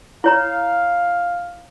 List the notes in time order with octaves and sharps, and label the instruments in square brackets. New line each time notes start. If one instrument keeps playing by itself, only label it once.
[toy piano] E4 C#5 A#5 [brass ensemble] F5